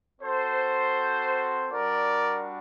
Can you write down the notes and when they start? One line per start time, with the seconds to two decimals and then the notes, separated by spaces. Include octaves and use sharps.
0.21 C4 F#4 A4 C5
1.71 G3 D4 F#4 A#4 D5